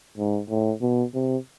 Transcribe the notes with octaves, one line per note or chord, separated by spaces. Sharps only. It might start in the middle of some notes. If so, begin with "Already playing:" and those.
G#2
A2
B2
C3